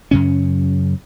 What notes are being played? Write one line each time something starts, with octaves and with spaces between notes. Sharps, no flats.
F#2 C#3 C#4